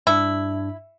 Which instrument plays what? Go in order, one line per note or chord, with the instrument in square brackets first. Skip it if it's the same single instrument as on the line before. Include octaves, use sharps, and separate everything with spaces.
[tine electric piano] G2 D4 [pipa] E4